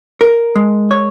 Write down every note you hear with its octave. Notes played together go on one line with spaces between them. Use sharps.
A#4
G#3
C#5